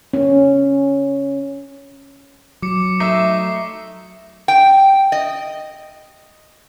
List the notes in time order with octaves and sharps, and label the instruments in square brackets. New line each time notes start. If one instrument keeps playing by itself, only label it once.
[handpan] C#4
[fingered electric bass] F#3 [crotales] D6 C#7
[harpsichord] A3 [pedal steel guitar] D#4 E5 [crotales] C7
[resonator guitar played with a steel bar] G5
D#5